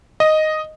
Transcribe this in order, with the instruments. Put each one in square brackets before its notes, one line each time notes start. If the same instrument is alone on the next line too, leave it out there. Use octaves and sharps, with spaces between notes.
[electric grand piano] D#5